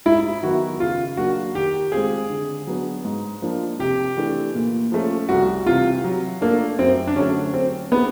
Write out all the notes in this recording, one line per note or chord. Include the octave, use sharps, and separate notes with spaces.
G#2 E4
D#3 F#3 B3 F#4
C#3 F4
F#3 A#3 D4 F#4
D#3 G4
G#3 C4 F4 G#4
D3
F#3 B3 D4
G#2
F3 A#3 D4
C3 G4
E3 A3 D4
A#2
F3 A3 C#4
C2 F#4
C3 E3 F4
F#3
A3 A#3 D4 F4 A4
F#2 C4
D4
D3 F#3 A3 C#4
F#3 C4
A3 B3 C4 D#4 G4